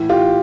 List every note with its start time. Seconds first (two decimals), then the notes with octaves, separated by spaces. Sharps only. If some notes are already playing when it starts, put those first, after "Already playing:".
Already playing: A2 E3
0.09 F4 G4